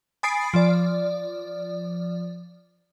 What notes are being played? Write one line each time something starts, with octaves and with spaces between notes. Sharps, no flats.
G#5 B5 D#6 A6 C7 D7
F3 D5